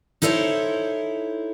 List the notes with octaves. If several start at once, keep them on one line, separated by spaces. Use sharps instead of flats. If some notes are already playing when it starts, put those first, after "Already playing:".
D#4 E4 A4 A#4 C5 C#5